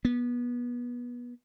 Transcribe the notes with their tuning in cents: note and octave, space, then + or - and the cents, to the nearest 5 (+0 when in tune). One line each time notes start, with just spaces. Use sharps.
B3 -25